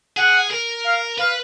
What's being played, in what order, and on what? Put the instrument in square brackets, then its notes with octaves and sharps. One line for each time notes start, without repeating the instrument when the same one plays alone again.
[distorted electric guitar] G#4 [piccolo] F#5
[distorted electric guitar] A#4
[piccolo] F5
[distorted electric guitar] B4 [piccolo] F5